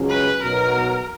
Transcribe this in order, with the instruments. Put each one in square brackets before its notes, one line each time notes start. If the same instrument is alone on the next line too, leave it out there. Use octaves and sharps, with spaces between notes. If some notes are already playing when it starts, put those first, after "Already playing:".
Already playing: [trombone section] C#2 C#3 F#3 C#4 G#4
[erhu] B4
[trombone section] B1 B2 F#3 B3 F#4 [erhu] A#4